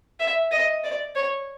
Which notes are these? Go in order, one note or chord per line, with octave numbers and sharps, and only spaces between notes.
E5
D#5
D5
C#5